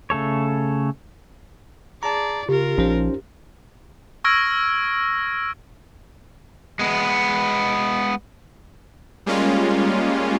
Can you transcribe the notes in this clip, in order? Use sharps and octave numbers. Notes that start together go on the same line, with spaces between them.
C#3 A3 A4 C#5
G#4 D5 A5 A#5
C#3 F4 G4 A#4
A#1 F3 C#4 D#4 C5
C#6 E6 F6 G#6 A#6 D7
G#3 B3
G3 G#3 A#3 C#4 F4